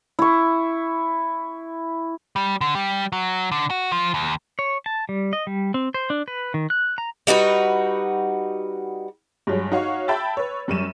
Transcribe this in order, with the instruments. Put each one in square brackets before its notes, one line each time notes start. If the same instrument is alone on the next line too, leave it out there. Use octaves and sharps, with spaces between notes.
[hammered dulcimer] E4 C#6
[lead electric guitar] G3
D3
G3
F#3
D3
F#4
F3
D#2
[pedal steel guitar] C#5
A5
G3
D#5
G3
C4
C5
D4
B4
D#3
F#6
A#5
[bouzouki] G3 D#4 F#4 B4
[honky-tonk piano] G2 F#3 G#3
D#4 F#4 C#5 F5 C#6
E5 G5 A5 B5 E6 A6
B4 C#5
F#2 G3 C#6 D#7 E7